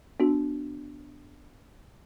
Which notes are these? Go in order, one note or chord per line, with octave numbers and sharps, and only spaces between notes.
B3 D4 F#4